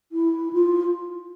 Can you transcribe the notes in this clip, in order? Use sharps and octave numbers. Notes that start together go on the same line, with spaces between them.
E4
F4